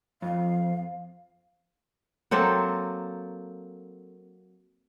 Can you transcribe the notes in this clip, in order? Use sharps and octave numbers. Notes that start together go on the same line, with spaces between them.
F2 F5
F#3 A#3 C4 A4